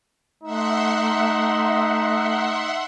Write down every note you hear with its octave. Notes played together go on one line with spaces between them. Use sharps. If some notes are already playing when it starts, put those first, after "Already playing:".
A3 D#4 E5 F#5 C6